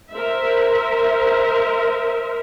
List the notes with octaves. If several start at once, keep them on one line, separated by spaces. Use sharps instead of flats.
A#4 C5 E5